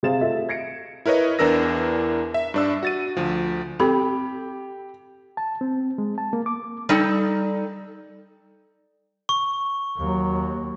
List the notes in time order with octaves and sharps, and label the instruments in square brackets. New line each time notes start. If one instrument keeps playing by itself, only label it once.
[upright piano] C3 G#4 C5 F5 A6 E7
A3 F4 A4 D#5 E5
G#6 A#6 C#7 D7
[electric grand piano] E4 A#4 B4 C#5 D#5
E2 E3 D4 A#4 E6 A#6
E5
G2 D4 E6
F#4 A6 D#7
D2 F3
[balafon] C4 A4 B5 [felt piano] G4
[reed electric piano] A5
C4
G#3
A5
A#3
D6
[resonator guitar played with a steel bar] G3 D#4 A4
[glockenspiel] C#6
[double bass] D#2 [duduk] F#3